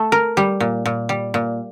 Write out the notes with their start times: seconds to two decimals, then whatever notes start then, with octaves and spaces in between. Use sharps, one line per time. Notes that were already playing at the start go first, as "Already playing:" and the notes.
Already playing: A3
0.12 A#4
0.37 G3
0.60 A#2
0.86 A#2
1.09 G3
1.34 A#2